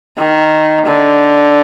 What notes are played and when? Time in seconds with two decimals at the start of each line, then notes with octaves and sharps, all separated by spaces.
0.18 D#3
0.86 D3